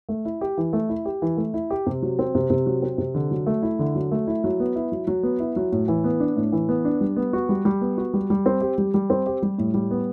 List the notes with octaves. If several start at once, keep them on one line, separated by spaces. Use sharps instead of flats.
A3
E4
G4
E3
A3
E4
G4
E3
A3
E4
G4
C3
F#3
C4
C3
C3
F#3
C4
C3
D3
F#3
A3
E4
D3
F#3
A3
E4
F#3
B3
E4
F#3
F#3
B3
E4
F#3
A2
E3
B3
D4
A2
E3
B3
D4
G3
B3
F#4
G3
G3
B3
F#4
G3
G3
C4
G4
G3
G3
C4
G4
G3
A2
G3
B3